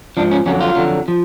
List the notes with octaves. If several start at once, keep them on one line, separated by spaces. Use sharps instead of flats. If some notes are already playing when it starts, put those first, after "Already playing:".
G#2 F3 D4
C#4
F2 D3 F#3 C#4
F4
F2 D3 F#3
F3